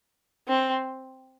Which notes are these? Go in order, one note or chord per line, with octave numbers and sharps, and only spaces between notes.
C4